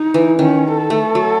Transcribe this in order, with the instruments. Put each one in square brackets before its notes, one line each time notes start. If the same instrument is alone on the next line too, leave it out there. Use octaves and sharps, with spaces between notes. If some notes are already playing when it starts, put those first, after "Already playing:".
Already playing: [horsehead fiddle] D#4
[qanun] E3
[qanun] D#3 [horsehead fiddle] C#4
[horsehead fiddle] A4
[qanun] A3
F#3